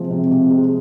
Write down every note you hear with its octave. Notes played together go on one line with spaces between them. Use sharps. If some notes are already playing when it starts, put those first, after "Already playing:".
Already playing: C3 F3 G#3
C3
C3
G#3